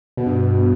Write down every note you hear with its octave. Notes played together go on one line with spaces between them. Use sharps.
B2
G2